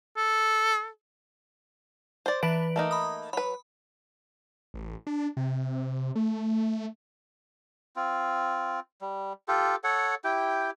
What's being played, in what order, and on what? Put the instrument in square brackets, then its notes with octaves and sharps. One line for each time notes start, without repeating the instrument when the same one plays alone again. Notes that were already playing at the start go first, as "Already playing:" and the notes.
[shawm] A4
[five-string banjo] C5 D5
[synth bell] E3 B4 D7 [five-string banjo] D4
[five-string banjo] A3 A#3 D#4
[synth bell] B5 D#6
[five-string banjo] F#3 B4 [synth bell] B5
[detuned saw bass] A1
D4
C3
A3
[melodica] C4 F4
G3
F4 G4 A4
A4 C#5 F#5
E4 G4 G5